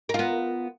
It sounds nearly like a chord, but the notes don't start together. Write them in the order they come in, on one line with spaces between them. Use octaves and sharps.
A#4 F4 B3